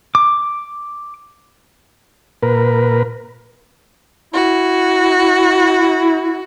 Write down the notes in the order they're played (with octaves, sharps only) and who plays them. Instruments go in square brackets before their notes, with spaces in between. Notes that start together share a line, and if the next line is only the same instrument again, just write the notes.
[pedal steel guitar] D6
[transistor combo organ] A#2 A#4 B4
[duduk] E4 [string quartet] F#4